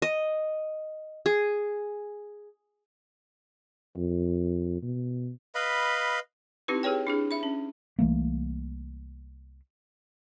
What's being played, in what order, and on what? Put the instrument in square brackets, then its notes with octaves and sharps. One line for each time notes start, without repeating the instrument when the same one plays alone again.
[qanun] D#5
G#4
[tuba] F2
B2
[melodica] B4 D#5 F5 B5
[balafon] C4 D#4 E4 G4 B4
G4 G#4 B4 C#5 G5
D4 E4 G#4
E5 B5
C#4
[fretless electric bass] C2 E3 A3 A#3